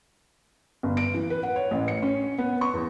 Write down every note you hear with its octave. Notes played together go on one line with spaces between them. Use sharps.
G1
D7
E3
B4
F#5
C#5
A1
C#7
C#4
B3
C#6
E2